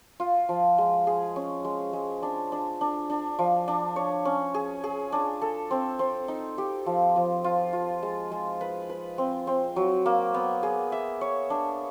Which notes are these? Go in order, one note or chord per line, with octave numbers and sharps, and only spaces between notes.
F4
F3
G#3
G#4
C#4
G#3
G#3
D4
D4
D4
D4
F3
D4
C#5
C#4
G#4
G#4
D4
A4
C4
C4
D#4
G4
F3
F3
F4
F4
G#3
G#3
B4
B4
C4
C4
F#3
A#3
B3
G#4
E5
C#5
D4